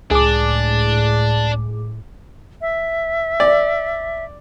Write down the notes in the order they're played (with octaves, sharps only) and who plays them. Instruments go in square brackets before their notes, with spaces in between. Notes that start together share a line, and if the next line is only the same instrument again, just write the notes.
[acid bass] C#2 [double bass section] A2 [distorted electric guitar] D4 [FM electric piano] G#4 D6
[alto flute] E5
[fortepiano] D5